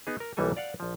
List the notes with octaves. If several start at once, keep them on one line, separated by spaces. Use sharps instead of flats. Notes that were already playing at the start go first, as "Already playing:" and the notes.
B3 D#4 G#4
A#4
B1 E3 G3 A#3 A4 G#5
D5 F5 F#5
A#1 F3